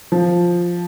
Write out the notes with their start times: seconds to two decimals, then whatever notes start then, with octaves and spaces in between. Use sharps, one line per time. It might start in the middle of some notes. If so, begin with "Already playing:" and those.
0.12 F3